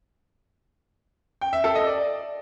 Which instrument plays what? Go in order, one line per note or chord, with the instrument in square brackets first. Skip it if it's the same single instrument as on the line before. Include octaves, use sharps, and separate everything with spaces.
[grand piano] G5
E5
A4
D#5
D5